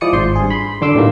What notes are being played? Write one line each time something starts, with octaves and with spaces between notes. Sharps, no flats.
F3 G#3 E4 D5 D#6 C#7
G#1 C5 C6
G2 G#4
B5 C6
F#2 D3 C6 D6 E6
A2 C3 D#3 E3 A#3